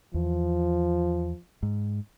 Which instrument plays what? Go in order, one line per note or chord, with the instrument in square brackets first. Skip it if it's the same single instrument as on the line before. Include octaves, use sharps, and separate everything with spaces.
[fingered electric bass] E2 [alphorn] F3
[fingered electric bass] G#2